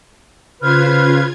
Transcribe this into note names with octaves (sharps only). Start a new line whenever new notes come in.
C#3 F4 B4 C5 F6 G#6